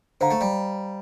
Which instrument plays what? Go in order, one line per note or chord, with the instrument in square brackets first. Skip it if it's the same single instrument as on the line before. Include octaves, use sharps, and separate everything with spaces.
[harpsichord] D3 [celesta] C5 F5 A#5
[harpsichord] A3
G3